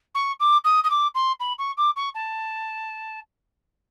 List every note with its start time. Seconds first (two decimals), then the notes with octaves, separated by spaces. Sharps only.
0.15 C#6
0.40 D6
0.64 D#6
0.84 D#6
0.90 D6
1.15 C6
1.40 B5
1.58 C#6
1.77 D6
1.96 C#6
2.15 A5